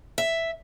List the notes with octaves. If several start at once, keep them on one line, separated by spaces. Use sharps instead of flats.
E5